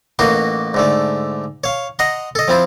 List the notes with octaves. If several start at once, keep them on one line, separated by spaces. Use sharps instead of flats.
A1 A#3 D#4 F#4 C6
G#2 D3 A3
C#5 F5
D#5 F#5 A#5 C6
A4 D#5
F3 C4 E4 F4